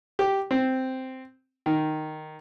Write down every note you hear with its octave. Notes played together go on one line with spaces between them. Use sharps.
G4
C4
D#3